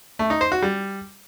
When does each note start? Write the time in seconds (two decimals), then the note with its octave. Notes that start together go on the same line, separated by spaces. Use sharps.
0.19 A3
0.30 D#4
0.41 C5
0.52 F#4
0.62 G3